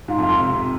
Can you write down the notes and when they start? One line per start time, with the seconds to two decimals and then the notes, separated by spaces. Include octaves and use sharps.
0.08 G#2 F4
0.18 F2
0.23 F4
0.29 F2
0.40 C3
0.55 C3